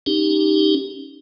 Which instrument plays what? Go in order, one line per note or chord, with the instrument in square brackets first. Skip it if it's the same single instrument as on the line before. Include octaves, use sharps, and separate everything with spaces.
[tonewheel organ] C#4 D#4 G4